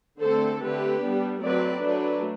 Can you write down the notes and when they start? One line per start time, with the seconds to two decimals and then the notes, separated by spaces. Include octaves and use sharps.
0.20 D3 A3 C4 A4 C5
0.61 D3 A3 C4 G4 B4
1.02 G3 B3 D4
1.43 F#3 A3 C4 B4 D5
1.83 F#3 A3 D4 B4 D5